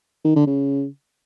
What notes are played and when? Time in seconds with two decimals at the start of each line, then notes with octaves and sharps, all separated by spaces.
0.25 D#3
0.36 D3
0.47 C#3